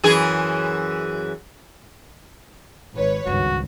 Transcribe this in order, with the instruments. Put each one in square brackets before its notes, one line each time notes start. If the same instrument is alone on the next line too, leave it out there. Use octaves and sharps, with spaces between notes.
[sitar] F#2 E3 G#4
[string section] G#1 B4 C#5
[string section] G#1 [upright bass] C#2 G2 [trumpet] F#4